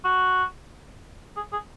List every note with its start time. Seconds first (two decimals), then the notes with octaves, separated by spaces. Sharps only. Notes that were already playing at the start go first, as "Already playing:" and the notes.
0.04 F#4
1.36 G#4
1.52 G#4